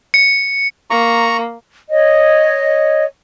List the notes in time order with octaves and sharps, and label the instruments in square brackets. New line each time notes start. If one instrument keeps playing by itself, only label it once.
[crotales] C#7
[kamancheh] A#3 [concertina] A#5 C#6
[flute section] C#5 D#5